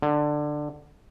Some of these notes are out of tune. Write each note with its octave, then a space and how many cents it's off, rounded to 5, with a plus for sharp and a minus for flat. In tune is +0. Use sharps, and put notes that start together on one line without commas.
D3 +15